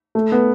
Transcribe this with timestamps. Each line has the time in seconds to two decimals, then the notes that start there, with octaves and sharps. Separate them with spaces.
0.15 A3
0.32 B3